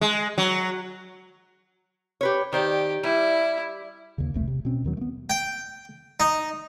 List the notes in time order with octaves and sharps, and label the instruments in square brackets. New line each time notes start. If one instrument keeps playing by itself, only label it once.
[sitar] G#3
F#3
[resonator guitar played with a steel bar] G4 B4 C#5
[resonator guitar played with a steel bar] D#3 C5 D5 [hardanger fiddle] G4
[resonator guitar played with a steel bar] G3 [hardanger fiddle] E4
[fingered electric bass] D#2 C#3
E1 C2 A3
C3
B2 C4 C#4
D#2 D#3 F#3
A3 B3
[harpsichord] G5
D#4